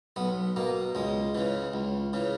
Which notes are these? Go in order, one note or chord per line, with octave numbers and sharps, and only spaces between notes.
B1 B3
B2 A#3
C#2 G#3
C#3 E3
C#2
C#3 E3